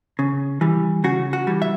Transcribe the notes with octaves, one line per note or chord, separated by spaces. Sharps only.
C#3
E3 G3
C#3 F#4
F#4
E3 G3
E5